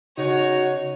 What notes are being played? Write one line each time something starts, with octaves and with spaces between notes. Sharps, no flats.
C#3 D#4 F#4 C#5